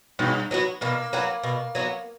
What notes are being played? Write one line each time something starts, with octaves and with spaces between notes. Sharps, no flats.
G2 B2
F#3 B3 F#4
B2 A#3
F#3 B3 F#4
B2
F#3 B3 F#4